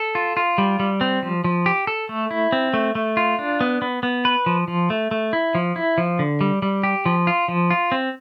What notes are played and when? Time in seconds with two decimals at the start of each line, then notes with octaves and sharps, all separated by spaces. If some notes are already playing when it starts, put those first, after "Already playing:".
Already playing: A4
0.15 F4
0.37 F4
0.58 G3
0.80 G3
1.01 C4
1.23 F3
1.44 F3
1.66 G4
1.87 A4
2.09 A3
2.31 E4
2.52 C4
2.74 A3
2.95 A3
3.17 F4
3.39 D4
3.61 B3
3.82 B3
4.03 B3
4.25 B4
4.46 F3
4.68 F3
4.90 A3
5.11 A3
5.33 E4
5.55 F3
5.76 E4
5.98 F3
6.19 D3
6.41 G3
6.62 G3
6.83 G4
7.06 F3
7.27 F4
7.48 F3
7.70 F4
7.92 C4